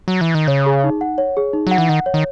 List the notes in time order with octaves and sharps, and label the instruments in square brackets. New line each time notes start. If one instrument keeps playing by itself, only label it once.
[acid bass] F#3
E3
D#3
[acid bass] C#3 [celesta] C#5
[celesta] G#4
D#4
F#5
C#5
G#4
D#4
[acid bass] F#3 [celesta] F#5
[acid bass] E3
[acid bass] D#3 [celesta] F#5
[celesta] C#5
[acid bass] D#3